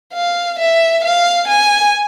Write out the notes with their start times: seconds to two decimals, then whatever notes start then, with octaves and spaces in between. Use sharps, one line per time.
0.14 F5
0.59 E5
1.04 F5
1.48 G#5